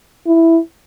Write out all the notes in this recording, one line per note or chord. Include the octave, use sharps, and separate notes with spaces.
E4